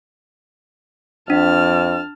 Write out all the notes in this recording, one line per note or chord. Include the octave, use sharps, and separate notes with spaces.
F2 D4 A5 F6